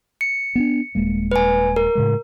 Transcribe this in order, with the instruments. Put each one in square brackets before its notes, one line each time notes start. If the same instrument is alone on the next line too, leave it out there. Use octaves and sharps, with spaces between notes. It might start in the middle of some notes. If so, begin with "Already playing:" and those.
[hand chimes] C#7
[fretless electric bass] B3 C#4 D4
D#1 G#3 A#3
[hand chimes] B4 G#5
A#4
[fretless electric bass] A2 C#3 G#3